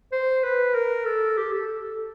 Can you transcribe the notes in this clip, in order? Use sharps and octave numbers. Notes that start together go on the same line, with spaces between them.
C5
B4
A#4
A4
G4
A4